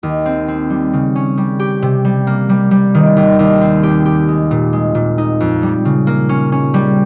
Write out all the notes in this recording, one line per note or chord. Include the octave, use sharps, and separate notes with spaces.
D#2
C4
C4
G3
C#3
C#4
G3
G4
C3
G3
A#3
G3
G3
D#3
D#2
D#2
C4
G4
G4
G#3
A#2
G#3
A#2
D#4
F2
G3
C#3
A#3
C#4
C#4
G3